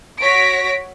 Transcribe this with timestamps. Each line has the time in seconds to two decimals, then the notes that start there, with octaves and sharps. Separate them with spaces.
0.21 F#4 C#5 A#6 B6 D7